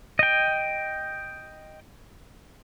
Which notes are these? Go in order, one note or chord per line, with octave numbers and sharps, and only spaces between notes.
D#5 G5